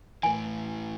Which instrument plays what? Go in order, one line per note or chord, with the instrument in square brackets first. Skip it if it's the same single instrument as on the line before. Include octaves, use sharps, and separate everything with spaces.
[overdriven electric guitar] A2 E3 [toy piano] G#5